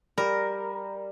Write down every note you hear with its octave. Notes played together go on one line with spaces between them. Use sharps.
G3 A#4